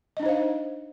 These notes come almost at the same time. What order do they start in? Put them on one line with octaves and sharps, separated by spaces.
D#5 D4 D#4 C5 F5